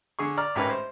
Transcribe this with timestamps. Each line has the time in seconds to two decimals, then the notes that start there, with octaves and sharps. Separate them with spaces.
0.19 D3 G#4 C#6
0.37 D5 A#5 F6
0.55 G#1 A2 C#4 G4 A#4 B4
0.70 C5